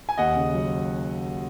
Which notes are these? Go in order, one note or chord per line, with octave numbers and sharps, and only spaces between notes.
G#5
D#2 D#5 F#5
C#3
F#3